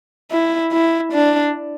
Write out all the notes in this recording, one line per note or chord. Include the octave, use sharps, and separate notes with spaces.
E4
E4
D4